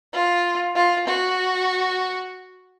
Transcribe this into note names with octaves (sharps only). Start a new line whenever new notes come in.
F4
F4
F#4